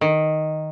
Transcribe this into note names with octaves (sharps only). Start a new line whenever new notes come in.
D#3